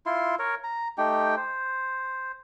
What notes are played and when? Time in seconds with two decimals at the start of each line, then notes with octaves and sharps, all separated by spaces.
0.06 E4 F4 C6
0.39 A#4 C#5
0.64 A#5
0.98 A3 D#4 G4 G5
1.37 C5